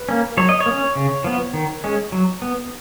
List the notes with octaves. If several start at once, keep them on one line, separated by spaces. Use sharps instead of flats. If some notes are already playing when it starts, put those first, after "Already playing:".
Already playing: B4
A#3 C#4
F#3 C#5
D#5
C#5
A#3
C#4
C#3
F3 B3
D#3
G#3 C#4
F#3
B3